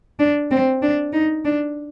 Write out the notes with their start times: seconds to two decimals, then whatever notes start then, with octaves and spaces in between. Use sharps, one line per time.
0.19 D4
0.51 C4
0.82 D4
1.13 D#4
1.45 D4